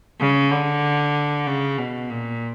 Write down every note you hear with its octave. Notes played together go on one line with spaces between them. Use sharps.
C#3
D3
C#3
B2
A#2